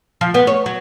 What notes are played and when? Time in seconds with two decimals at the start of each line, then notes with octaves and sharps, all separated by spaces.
0.21 F3
0.34 B3
0.47 C#5
0.66 F#3